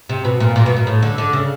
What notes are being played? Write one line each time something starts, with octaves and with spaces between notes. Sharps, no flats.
C3
B2
A#2
A#2
B2
A#2
A2
D3
D3
C#3